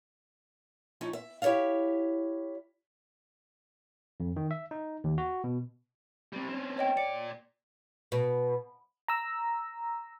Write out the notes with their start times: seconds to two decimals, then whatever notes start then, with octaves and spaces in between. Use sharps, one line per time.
1.01 F3 C#4 D#4 E4
1.13 E5
1.42 E4 G4 C#5 E5 F5
4.20 F2
4.36 D#3
4.51 E5
4.71 D#4
5.04 D#2
5.18 F#4
5.44 B2
6.33 G3 C4
6.49 C4 C#4
6.78 C#5 D#5 G5
6.97 A#2 D5 C#7
8.12 B2
9.08 A#5 E6